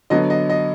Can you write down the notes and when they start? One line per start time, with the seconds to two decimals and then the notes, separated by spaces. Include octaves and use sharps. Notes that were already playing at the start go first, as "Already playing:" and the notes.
0.10 D3 F#3 B3 D#5
0.30 D#5
0.49 D#5